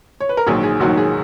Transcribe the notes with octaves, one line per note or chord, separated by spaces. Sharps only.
C#5
B4
A#4
A#1 G#2 D#3 F#3 G#4
G#4
A#1 G#2 D#3 F#3 F#4
G#4